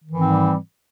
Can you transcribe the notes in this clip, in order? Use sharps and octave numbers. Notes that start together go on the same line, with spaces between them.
G#2 D#3 E3 G3 C4